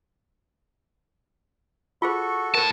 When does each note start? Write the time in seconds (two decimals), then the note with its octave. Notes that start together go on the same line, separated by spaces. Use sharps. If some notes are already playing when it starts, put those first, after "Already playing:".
2.02 F4 F#4 G#4 A4 C5 C#6
2.55 A2 A#4 C5 A5